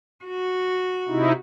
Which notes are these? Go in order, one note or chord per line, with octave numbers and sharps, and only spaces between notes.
F#4
C3 D#4 E4